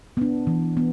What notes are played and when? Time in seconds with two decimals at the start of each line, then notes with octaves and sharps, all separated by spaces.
0.17 B3 D4
0.47 E3
0.77 B3